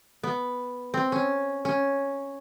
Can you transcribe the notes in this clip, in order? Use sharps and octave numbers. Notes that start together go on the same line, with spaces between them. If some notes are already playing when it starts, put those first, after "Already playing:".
B3
C4
C#4
C#4